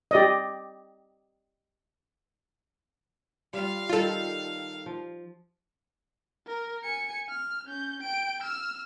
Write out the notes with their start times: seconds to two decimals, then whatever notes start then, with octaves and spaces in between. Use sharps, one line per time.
0.11 G4 D5 D#5
3.53 G3 F4 F5
3.89 D#3 G3 F4 A4
4.86 F3
6.47 A#4
6.84 G#5 C#7
7.29 F6
7.66 C#4 G6
8.03 G5 D7
8.43 E6 F6